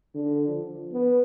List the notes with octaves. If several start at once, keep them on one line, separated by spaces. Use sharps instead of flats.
D3
F3
B3